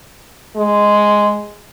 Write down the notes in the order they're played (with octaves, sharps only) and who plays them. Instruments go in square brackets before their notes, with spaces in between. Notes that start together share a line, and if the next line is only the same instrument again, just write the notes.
[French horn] G#3